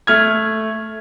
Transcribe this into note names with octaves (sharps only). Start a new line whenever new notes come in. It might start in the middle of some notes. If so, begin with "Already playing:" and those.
A3 F6 G#6